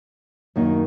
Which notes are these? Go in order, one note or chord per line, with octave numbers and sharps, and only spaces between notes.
F#2 D#3 A#3 D#4